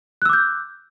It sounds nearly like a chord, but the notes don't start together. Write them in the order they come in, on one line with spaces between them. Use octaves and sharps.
F#6 E6 D6 G6